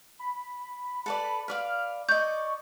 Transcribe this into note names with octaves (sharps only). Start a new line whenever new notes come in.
B5
A4 B4 D5
B4 D5 F5 F6
D5 D#5 C#6 G6